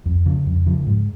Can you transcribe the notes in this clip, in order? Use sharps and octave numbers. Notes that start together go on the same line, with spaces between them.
F2
C#3 F3
F2
C#3 F3
G#2